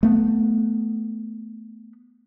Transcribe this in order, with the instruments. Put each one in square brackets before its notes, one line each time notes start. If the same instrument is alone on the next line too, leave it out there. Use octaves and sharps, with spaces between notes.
[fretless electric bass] A3 B3